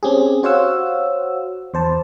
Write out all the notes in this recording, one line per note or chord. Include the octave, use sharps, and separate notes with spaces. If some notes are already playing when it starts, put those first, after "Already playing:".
C4 C#4 G4 G#4
F#4 C5 C#5 F5 F#5 E6
E2 C5 A5